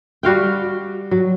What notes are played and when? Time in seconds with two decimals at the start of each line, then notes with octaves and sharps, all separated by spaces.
0.23 G3 F#4 F5 G5
1.11 F#3